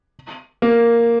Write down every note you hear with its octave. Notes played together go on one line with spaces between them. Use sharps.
A#3